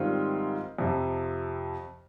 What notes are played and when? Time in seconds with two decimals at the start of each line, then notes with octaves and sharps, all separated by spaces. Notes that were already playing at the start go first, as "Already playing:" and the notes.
Already playing: G#2 D#3 G3 C4 F4
0.78 F2 C3 F3